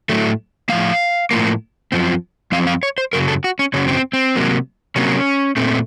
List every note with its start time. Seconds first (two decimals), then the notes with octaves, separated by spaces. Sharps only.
0.09 A2 F#3 A3
0.69 A2 F3 A#3 F5
1.31 A2 F3 A#3
1.92 F#2 F3 C4
2.52 F#2 F3 C4 F5
2.67 F5
2.83 C#5
2.98 C5
3.13 F#2 C#3 F#3 A#4
3.28 A4
3.44 F#4
3.59 C#4
3.74 F#2 C#3 F#3 C#4
3.88 C4
4.13 C4
4.36 C3 F#3 A#3
4.96 C3 F#3 A#3 C#4
5.56 A#2 A3 C4